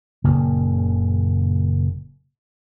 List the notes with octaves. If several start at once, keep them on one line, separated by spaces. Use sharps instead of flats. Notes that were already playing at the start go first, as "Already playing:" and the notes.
F#1 A#2 C#3 A#3